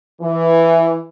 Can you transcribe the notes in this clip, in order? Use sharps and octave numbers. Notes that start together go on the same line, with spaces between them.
E3